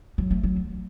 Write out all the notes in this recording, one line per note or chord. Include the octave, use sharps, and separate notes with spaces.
F#3
A3
F#3